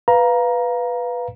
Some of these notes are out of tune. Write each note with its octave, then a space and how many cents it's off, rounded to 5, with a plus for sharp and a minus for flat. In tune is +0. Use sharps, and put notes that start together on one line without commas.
B4 +0 F5 +0 A#5 +15